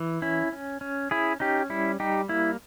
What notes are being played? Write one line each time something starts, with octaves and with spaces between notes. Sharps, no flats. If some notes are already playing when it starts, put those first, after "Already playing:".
Already playing: E3
C#4 E4
C#4
C#4
C#4 E4 G#4
C#4 D#4 G4
G3 E4
G3 D#4 G4
A#3 E4